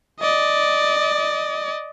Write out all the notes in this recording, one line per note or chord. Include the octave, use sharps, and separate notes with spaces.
D5 D#5